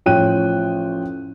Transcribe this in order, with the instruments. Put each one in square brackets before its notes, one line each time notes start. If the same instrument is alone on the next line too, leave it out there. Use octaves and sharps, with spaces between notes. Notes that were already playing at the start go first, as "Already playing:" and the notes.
[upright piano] A1 F3 C#5 G5 F#6 D#7